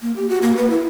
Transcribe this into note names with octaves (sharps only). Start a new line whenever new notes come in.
A#3
G4
F#4
A#3
B4
E4